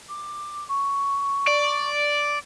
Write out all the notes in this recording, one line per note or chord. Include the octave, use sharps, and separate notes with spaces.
D6
C#6
D5